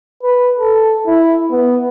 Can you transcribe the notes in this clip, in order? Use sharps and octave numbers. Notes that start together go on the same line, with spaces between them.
B4
A4
E4
B3